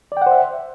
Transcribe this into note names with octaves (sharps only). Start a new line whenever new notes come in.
C5 D5 E5 F#5 G5